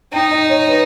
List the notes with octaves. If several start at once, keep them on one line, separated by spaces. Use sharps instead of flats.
D#4 G5
D#5
C#5
B4